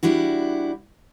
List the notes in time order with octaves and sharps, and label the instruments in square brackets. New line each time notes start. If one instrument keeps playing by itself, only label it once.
[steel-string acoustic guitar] G3 D4 E4 F#4